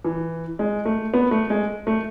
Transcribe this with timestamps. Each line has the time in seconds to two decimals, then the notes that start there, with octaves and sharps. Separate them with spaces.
0.04 E3
0.59 G#3
0.86 A3
1.14 B3
1.31 A3
1.50 G#3
1.87 A3